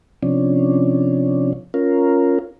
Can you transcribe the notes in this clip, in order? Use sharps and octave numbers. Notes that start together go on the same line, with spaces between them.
C3 F3 C#4 D4
C#4 F4 A#4